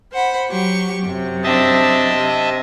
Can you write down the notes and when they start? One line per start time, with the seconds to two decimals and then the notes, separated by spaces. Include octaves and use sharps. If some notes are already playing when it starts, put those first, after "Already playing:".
0.11 C5 F#5 B5
0.49 F#3 G4 C#6
1.03 F#2 C3
1.44 C4 D4 D#5 E5 A5
2.11 C3